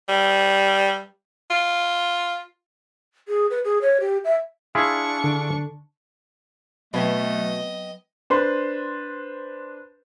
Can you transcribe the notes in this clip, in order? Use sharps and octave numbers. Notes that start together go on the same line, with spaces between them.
G3
F4
G#4
B4
G#4
C#5
G4
E5
D4 E4 F4 G#4 C#6
D3
B2 F#3 A3 B4 D#5 G5
D4 B4 C5 C6